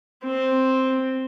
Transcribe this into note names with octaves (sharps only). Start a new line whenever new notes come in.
C4